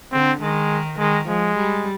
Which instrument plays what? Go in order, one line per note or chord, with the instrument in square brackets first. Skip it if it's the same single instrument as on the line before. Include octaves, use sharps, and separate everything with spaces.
[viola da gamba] D3 [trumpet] C4
[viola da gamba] D#3 [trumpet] G#3
[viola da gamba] D#3 [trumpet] G#3
[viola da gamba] F3 [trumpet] G#3
[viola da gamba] G3